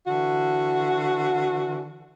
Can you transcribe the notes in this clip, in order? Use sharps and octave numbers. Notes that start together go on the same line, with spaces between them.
D3 E3 F#4